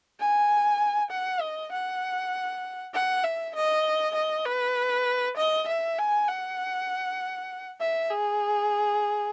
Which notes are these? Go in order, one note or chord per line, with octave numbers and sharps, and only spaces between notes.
G#5
F#5
D#5
F#5
F#5
E5
D#5
D#5
B4
D#5
E5
G#5
F#5
E5
G#4